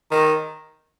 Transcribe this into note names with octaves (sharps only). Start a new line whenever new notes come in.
D#3